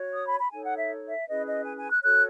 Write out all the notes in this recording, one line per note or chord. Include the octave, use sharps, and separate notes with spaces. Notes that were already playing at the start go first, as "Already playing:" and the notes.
Already playing: F#4 C#5
D#6
B5
B5
D#4 A4 C#5 G#5
F#5
E5
E5
C#4 E4 G#4 B4 D#5
D#5
G#5
G#5
F#6
F#4 A4 C#5 F#6